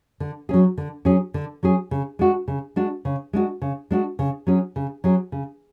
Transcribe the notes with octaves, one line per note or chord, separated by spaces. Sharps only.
D3
F#3 C#4 G#4
D3
F#3 C#4 G#4
D3
F#3 C#4 G#4
C#3
G#3 D4 F#4
C#3
G#3 D4 F#4
C#3
G#3 D4 F#4
C#3
G#3 D4 F#4
C#3
F#3 C#4 G#4
C#3
F#3 C#4 G#4
C#3